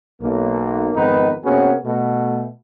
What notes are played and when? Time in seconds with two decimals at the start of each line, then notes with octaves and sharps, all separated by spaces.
0.22 B1 A#3
0.94 F2 G#2 D#3 B3 D#4 B4
1.44 C3 A#3 B3 C#4 F#4 G#4
1.85 B2 A3